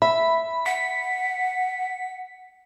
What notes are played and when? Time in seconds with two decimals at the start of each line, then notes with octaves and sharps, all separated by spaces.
0.02 E5 B5
0.66 F#5 B6